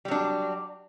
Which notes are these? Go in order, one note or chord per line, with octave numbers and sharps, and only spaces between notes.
F#3 G3 D4